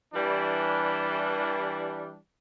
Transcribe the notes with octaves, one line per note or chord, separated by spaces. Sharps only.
E3 G3 D4